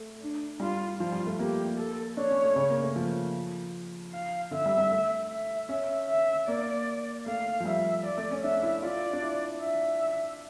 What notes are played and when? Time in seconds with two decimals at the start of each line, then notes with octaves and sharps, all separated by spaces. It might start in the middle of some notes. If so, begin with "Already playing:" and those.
Already playing: A3
0.21 D4
0.60 G3 F4
1.00 F3 F4
1.12 G3
1.26 A3
1.39 A#3 G4
1.78 A4
2.17 D4 C#5
2.31 C#4
2.44 A3
2.56 C#3
2.70 A#3
2.83 A3
2.96 F3
4.13 F5
4.51 D3 E5
4.66 G3
4.77 G3
4.92 A3
5.30 E5
5.69 C#4 E5
6.09 E5
6.48 A#3 D5
7.26 A3 F5
7.60 F3
7.65 G3 E5
8.04 D5
8.17 A3
8.31 C#4
8.43 D4 E5
8.63 E4
8.82 F4 D5
9.13 D4
9.22 E4
9.61 E5